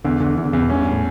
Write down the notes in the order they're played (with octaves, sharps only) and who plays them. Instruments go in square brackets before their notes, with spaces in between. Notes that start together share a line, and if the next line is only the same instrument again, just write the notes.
[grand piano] E2 [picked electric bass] D3
[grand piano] E2 [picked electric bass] D3
[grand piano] E2 [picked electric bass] E3
[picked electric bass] D3
[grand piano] E2 [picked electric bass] C#3
[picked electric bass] B2
[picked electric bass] G2 [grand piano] C#4
[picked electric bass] G2
A2